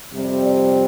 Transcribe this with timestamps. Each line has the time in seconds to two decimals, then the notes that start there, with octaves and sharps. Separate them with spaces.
0.13 F2 C3 G3 C4
0.43 D5